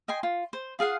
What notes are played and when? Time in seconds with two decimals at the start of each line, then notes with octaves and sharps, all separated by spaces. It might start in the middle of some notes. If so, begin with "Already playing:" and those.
0.08 D#5 G5 G#5 C6
0.23 F4
0.53 C5
0.79 F4 G#4 F5 F#5